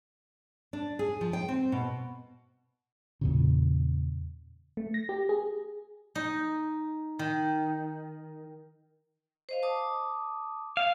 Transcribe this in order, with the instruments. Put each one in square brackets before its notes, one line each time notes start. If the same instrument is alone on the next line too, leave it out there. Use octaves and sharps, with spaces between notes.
[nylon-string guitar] D4
G#4
F3
G5
C4
B2
[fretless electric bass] E2 A#2 C#3
[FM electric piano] A3
A#6
G4
G#4
[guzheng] D#4
D#3
[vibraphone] C5 D#5 F5
A5 D6 D#6
[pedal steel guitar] F5